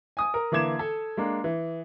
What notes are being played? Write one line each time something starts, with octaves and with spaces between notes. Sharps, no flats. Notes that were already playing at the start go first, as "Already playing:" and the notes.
G#5 D#6
A#4
D3 E3 A#3 D6 G#6 E7
A4
G#3 A#3 D4
E3